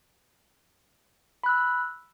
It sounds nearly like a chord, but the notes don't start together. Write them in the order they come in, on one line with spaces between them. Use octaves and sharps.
B5 F#6 E6